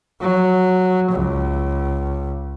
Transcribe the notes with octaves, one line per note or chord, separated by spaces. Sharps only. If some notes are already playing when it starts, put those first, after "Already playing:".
F#3
C#2